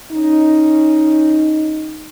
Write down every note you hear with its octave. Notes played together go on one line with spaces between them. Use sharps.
C#4 D#4